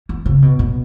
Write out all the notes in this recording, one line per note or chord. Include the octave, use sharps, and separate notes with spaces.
E3
C#3
B2
B2